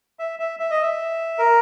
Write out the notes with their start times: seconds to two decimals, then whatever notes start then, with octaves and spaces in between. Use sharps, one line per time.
0.19 E5
0.40 E5
0.60 E5
0.71 D#5
0.82 E5
1.38 A#4